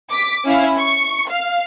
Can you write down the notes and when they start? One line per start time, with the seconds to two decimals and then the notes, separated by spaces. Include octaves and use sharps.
0.11 D6 B6
0.45 C#4 E4 F5
0.77 C#6
1.30 F5